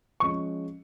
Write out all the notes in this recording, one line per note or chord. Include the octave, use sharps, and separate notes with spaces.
F3 G#3 C#4 C#6